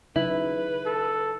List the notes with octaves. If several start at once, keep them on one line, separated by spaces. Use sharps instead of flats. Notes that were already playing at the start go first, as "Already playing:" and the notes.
C#3 F#3 D#4 E4 B4
A4